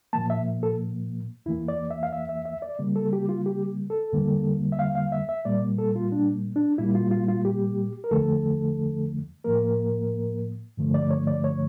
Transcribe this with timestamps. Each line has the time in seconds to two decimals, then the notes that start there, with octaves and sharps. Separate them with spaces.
0.13 A#2 F3 A#3 A5
0.30 E5
0.63 A4
1.46 E2 E3 A#3 E4
1.68 D5
1.91 E5
2.03 F5
2.13 E5
2.29 E5
2.46 E5
2.62 D5
2.79 C#3 G3 A#3
2.96 A4
3.13 G4
3.29 F4
3.46 G4
3.90 A4
4.12 E2 D3 G3 A#3
4.72 E5
4.79 F5
4.95 F5
5.12 E5
5.29 E5
5.45 A#2 G3 A#3 D5
5.78 A4
5.95 F4
6.12 D4
6.56 D4
6.78 A#2 G3 A#3 E4
6.95 F4
7.11 F4
7.28 F4
7.45 G4
8.04 A#4
8.11 E2 D3 F3 A3 A4
9.44 A2 F3 A#3 A#4
10.77 G2 D3 F3 A3
10.94 D5
11.11 C#5
11.27 D5
11.44 C#5